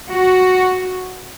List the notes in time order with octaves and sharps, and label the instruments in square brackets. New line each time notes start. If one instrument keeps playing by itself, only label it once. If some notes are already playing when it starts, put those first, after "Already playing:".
[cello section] F#4